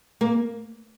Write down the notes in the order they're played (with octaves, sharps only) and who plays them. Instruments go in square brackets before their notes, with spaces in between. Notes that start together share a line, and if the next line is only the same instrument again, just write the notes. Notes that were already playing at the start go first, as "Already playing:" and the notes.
[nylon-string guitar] A#3